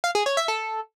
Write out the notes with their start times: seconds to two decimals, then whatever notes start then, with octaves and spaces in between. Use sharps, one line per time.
0.04 F5
0.15 G#4
0.26 C#5
0.37 E5
0.48 A4